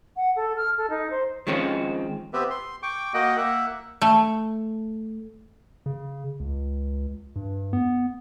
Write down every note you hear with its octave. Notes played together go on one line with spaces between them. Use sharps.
F#5
A4
F6
A4
D#4
C5
D#3 F3 G#3 C4 C#4 D#4
B3 C4 G4 B4 E5
C6
G5 C#6 D6
A#3 F#4 D#5 F#5 G5
A#3 E5 F#5
A3
C#3
C#2
G2
B3